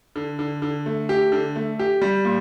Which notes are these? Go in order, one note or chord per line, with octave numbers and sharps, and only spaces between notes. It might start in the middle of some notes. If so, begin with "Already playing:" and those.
D3
D3
D3
A3
G4
D3
A3
G4
G3
A#2